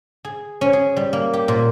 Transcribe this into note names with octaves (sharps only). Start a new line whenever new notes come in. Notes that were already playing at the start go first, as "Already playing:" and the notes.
G#4
C#4
G#4
G3
A#3
G4
A#2